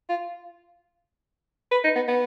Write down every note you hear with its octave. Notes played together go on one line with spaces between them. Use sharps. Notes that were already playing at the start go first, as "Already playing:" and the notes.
F4
B4
D#4
B3
B3